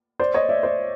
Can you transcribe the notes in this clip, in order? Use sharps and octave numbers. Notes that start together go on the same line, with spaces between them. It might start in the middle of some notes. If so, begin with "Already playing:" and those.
C5 D5
C#5 D#5
D5 E5
C5 D5